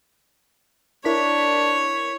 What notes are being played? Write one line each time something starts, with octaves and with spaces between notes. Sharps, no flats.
D4 E4 A#4 C#5 B6